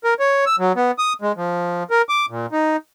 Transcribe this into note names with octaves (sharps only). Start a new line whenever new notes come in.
A#4
C#5
E6
F#3
B3
D#6
G#3
F3
A#4
D6
A#2
D#4